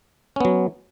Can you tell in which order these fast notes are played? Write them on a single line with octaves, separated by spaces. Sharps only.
C#4 B3 F#3